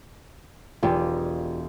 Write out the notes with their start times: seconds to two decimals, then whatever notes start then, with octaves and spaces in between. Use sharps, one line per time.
0.83 E1 F4 G4 D5